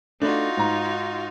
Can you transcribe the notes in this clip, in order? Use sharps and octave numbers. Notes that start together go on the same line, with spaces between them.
A3 D4 D#4 F4 F#4
G#2 A#5